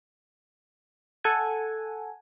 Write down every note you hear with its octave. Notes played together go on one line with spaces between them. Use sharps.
A4 F#5 G#5